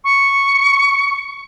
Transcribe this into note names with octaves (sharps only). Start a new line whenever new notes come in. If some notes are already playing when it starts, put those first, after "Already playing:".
C#6